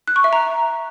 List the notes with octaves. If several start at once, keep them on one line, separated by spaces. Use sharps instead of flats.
F#6
C#6
E5
A#5